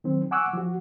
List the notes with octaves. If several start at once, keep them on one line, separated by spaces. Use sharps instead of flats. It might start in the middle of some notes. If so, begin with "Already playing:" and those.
D#3 F#3 C4
F#5 G#5 C#6 D6 E6 F#6
F3 F#4